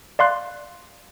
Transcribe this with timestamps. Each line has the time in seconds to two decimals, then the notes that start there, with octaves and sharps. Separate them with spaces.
0.19 D5 F5 C6 F#6